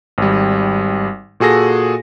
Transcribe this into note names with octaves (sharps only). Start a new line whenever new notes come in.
G#1 G3
A#2 F#4 G#4 A4 A#6